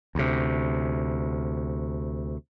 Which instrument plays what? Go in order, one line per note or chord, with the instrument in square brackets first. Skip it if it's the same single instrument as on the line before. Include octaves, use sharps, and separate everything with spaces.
[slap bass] D2 C3